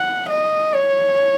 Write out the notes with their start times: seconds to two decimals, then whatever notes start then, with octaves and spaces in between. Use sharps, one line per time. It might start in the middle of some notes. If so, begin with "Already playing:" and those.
Already playing: F#5
0.29 D#5
0.74 C#5